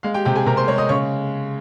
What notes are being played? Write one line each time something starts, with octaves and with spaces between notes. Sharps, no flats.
G#3 F5
G4 G5
C3 G4 G5
G#4 G#5
C3 A#4 A#5
C5 C6
G#3 C#5 C#6
D#5 D#6
C#3 C#5 C#6